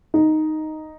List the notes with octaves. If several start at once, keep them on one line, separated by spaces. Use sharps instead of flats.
D#4